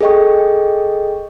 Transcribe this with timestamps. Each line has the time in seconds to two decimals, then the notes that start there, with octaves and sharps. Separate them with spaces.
0.01 G#4 A4 D#5 G5 C#6